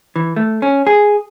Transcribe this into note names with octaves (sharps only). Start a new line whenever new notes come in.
E3
A3
C#4
G#4